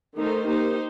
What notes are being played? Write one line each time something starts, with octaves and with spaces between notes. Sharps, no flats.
D#3 A3 D#4 A4 C5
A#3 D#4 G4 C5